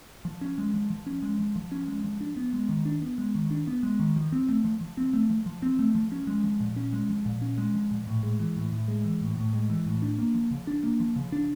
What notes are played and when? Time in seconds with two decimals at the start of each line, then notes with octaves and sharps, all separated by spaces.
0.25 F3
0.41 C#4
0.58 G#3
0.74 F3
0.90 F3
1.06 C#4
1.22 G#3
1.39 F3
1.56 F3
1.72 C#4
1.88 G#3
2.04 F3
2.21 D4
2.36 B3
2.53 G#3
2.69 D#3
2.85 D4
3.02 B3
3.18 G#3
3.35 D#3
3.51 D4
3.67 B3
3.83 G#3
4.00 D#3
4.16 F3
4.32 C4
4.49 A3
4.64 F3
4.81 F3
4.97 C4
5.13 A3
5.30 F3
5.46 F3
5.62 C4
5.79 A3
5.95 F3
6.12 C#4
6.27 G#3
6.44 F3
6.60 A#2
6.76 C#4
6.93 G#3
7.09 F3
7.26 A#2
7.42 C#4
7.58 G#3
7.74 F3
7.91 A#2
8.07 A2
8.23 G#3
8.39 E3
8.56 A2
8.72 A2
8.88 G#3
9.05 E3
9.21 A2
9.37 A2
9.53 G#3
9.70 E3
9.86 A2
10.02 D4
10.18 A#3
10.35 F3
10.51 C#3
10.67 D4
10.83 A#3
11.00 F3
11.16 C#3
11.32 D4